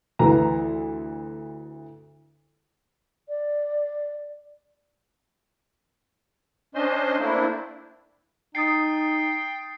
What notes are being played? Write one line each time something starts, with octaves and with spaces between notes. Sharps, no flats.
D2 E3 A#5
D5
C#4 D4 C5 D#5 C6
A3 A#3 C4 D4 E4
D#4 G5 D#6 A6 C7 C#7